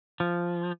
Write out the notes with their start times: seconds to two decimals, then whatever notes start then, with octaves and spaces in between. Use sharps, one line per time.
0.20 F3